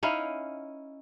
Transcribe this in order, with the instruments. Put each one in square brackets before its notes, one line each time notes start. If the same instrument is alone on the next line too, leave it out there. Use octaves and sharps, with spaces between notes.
[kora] C#4 D#4 E4 F5